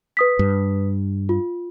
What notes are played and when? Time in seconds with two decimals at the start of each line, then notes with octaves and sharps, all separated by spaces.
0.17 B4 D#6 B6
0.39 G2
1.29 F4